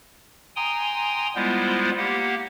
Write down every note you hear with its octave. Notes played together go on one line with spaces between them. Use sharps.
G5 G#5 A#5 C6 D#6
G3 G#3 B3 E4 F4 C5
A#3 G4 F#5